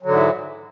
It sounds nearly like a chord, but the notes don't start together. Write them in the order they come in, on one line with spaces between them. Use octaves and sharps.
F#3 D3 G#2 E3